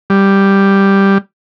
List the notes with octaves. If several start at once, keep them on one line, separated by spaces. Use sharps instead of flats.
G3